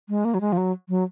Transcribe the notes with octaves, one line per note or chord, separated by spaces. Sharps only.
G#3
A#3
F#3
G#3
F3
F#3
F#3